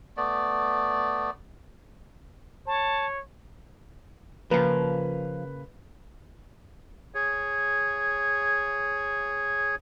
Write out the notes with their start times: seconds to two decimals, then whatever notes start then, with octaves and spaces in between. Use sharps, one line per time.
0.17 A3 B3 D5
2.67 C#5 A5
4.51 C#3 F3 A#3 B4
7.15 G#4 C#5